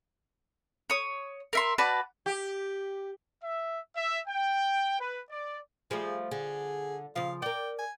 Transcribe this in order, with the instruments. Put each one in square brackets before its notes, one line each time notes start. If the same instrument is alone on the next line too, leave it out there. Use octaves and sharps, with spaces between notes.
[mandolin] C#5 D#6
A#4 E5 C6
F#4 B4 D5 A5
[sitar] G4
[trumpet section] E5
E5
G5
B4
D5
[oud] F3 G3 A3 [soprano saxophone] G#4
[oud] D3 [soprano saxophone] G#4
[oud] C#3 F3 [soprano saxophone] F5
[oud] A#4 D5 [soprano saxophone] G5
[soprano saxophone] G#5